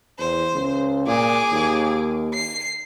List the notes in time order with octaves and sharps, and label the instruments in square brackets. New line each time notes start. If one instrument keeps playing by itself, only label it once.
[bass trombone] E2 [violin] C5
[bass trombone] C#2
[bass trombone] A#2 [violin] G#4 D6
[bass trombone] D#2
[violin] C7